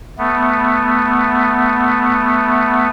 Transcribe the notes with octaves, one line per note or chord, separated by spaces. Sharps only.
A3 B3